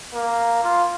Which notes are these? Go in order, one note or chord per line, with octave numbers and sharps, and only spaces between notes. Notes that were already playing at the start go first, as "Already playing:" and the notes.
A#3
F4